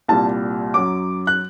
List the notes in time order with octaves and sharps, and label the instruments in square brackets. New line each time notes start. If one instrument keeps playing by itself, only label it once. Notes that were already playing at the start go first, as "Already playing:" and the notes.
[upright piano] C2 A#2 G3 A5
F#2 F#3 D6
F#6